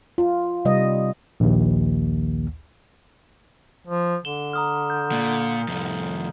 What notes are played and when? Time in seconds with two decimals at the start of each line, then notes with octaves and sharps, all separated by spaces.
0.18 F4
0.65 C3 G3 D#5
1.40 A#1 D#2
3.87 F3
4.25 D3 E7 G7
4.53 A#5 D#6 F6
4.90 G6
5.12 A#2
5.68 C2 F2